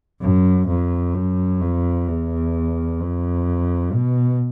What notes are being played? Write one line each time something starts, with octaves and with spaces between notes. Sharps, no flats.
F#2
F2
F#2
F2
E2
F2
B2